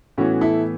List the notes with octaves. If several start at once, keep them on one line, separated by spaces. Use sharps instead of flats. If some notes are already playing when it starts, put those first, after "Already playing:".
A2 E3 B3 C#4 F#4
E4 A4